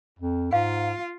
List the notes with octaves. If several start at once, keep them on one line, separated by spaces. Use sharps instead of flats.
F2
G#2 F4 F5